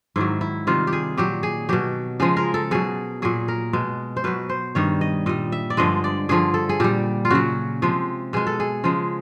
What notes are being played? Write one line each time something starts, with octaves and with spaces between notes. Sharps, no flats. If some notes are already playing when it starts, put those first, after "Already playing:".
G#2 D#3 F#3 E4
E4
C3 D#3 G3 F4
G4
G#4
A#2 F#3 G4
G#4
B2 F#3 G4
C#3 F3 G#3 G#4
A#4
A4
B2 F#3 G#4
A#2 F#3 G#4
A#4
B2 G#3
C5
B2 F#3 B4
C5
G2 D#3 G3 C#5
D#5
A#2 G3 D#5
E5
D5
G2 D3 F3 G#3 D#5
D5
G2 D3 F3 G#4
A4
G#4
A#2 G3 G4
F4
C#3 F#3 F#4
C3 F3 G#3
B2 G#3 G#4
A4
G#4
C#3 F3 G#3